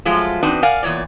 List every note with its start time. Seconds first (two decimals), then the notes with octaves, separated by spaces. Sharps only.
0.05 F3 F#3 G#3 A3 F4
0.43 E2 C4 D4 D#4 F#4 B4
0.63 A#4 D5 F5 F#5 G#5
0.83 E2 A#2 C#5 D5